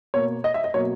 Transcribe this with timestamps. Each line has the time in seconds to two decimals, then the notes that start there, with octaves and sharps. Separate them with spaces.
0.14 B2 A#3 C#5
0.44 D#5
0.54 E5
0.64 D#5
0.74 B2 F#3 A#3 C#5